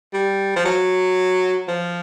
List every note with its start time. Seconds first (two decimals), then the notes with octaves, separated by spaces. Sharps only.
0.13 G3
0.56 F3
0.65 F#3
1.68 F3